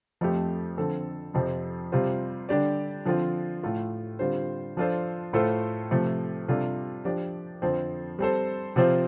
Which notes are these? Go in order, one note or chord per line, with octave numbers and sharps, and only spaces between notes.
F2 F3 A3 C4 G4
D3 F3 C4 A4
F2 C3 F3 C4
C3 G3 F4 C5
D3 G3 D4 G4 D5
D3 F3 C4 F4
A2 A3 F4
D3 G3 C4 F4 C5
F3 D4 F4 A4 C5
A2 A3 F4 A4 C5
C3 F3 A3
C3 G3 D4 F4 A4
F3 D4 G4 D5
F2 D3 F3 C4
G3 C4 A4 C5
C3 F3 C4 F4 C5